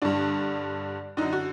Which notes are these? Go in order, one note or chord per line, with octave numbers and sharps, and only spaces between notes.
G2 D3 D4
F#2 D3 D#4
F#4